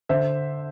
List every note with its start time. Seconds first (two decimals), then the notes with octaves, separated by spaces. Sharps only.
0.09 D3 C5 E5